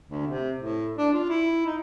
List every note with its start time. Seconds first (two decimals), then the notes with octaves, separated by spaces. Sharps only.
0.08 D2
0.27 C3
0.58 A2
0.97 D4
1.13 F4
1.29 E4
1.66 D#4